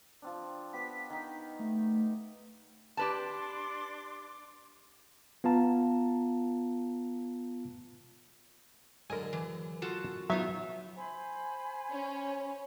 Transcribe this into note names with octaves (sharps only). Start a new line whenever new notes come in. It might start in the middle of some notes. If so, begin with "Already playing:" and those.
F3 C4 D4
B3 G4 B6
D#3 D#4
A3
D4 G4 B4 A5 C6 D6
B3 F4 F5 A5 A#5
F#2 D3 G#3 A#4 G#5
E3
F4 F#4 A4
F#3 B3 D#4 F4 E5
C5 G#5 B5
C#4